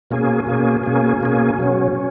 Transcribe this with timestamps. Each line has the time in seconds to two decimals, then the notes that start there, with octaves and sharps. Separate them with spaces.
0.11 B2 A#3 C#4 G#4
0.47 B2 A#3 C#4 G#4
0.84 B2 A#3 C#4 G#4
1.20 B2 A#3 C#4 G#4
1.58 B2 F#3 C#4
1.95 C#4